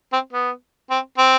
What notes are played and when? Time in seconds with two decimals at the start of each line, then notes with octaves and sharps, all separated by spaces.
0.12 C4
0.33 B3
0.90 C4
1.18 C4